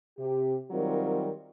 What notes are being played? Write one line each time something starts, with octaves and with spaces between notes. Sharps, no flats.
C3 G4
D#3 F#3 G3 C4 F4 A#4